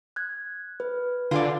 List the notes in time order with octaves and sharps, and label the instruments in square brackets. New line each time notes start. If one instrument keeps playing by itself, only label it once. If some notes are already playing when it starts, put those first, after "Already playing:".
[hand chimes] F#6 G#6
B4
[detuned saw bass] D3 [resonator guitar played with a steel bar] F4 G#4 D5